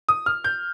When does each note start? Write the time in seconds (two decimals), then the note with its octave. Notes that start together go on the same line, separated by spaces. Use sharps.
0.09 D#6
0.26 F6
0.44 G6